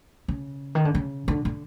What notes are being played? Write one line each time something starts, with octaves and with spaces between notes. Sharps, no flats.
C#3
D#3
D3
C#3
D3
D3